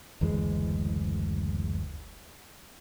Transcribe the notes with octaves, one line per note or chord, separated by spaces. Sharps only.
F#1 D2 E3 G#3